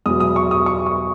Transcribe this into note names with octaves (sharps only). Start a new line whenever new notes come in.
E2 B2 F#3 D#6
D#6
C#6
D#6
C#6
C#6